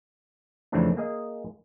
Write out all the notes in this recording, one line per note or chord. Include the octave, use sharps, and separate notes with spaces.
F2 C#3 E3 A3 C4 D4
A#3 G#4 D#5